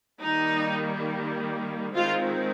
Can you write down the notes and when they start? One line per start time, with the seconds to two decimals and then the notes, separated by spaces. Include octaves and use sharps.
0.22 D#3 G3 A#3 D#4
1.95 D#3 G#3 C4 F4